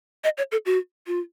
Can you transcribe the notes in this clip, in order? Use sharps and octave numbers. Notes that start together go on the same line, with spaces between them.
D#5
C#5
A4
F#4
F4